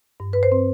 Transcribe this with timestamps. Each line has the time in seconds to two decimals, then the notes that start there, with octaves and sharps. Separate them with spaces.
0.20 G2
0.33 G2 B4
0.43 C5
0.52 C4